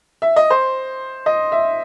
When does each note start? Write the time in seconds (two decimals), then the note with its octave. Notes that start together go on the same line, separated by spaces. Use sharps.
0.22 E5
0.36 D#5
0.50 C5
1.26 D#5
1.52 E5